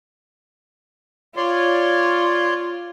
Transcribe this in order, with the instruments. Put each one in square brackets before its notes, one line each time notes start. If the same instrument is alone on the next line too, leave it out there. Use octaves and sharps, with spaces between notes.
[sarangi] F4 [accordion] C#5 D5 C6